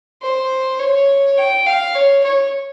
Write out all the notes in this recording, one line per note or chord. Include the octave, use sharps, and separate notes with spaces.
C5
C#5
G5
F5
C#5
C#5